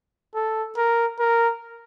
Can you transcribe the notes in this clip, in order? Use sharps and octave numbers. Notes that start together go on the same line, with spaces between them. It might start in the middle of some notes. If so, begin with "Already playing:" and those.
A4
A#4
A#4